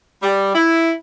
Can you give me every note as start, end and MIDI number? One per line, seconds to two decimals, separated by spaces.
0.22 0.52 55
0.55 0.92 64